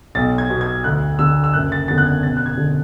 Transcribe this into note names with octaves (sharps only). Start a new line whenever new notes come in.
B1 A6
G#6
B2
G#6
D2 F#6
D3 E6
E6
F#1 F#6
A6
E2 D3 A6
F#6
G#6
E1 A6
F#6
G#6
D3